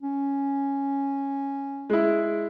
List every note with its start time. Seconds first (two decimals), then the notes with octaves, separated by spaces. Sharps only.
0.02 C#4
1.90 G#3 E4